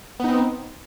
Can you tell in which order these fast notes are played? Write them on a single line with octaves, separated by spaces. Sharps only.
B3 D#4 C4